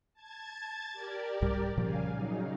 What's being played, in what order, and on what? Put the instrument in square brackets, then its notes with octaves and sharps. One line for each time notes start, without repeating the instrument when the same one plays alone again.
[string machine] A5 G#6 A6
G4 A#4 D5
[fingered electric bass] C2 G#2 G3
[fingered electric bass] A#2 F3 G3 [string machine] C#3 F5 G#5
[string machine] C#3 F#3 D#4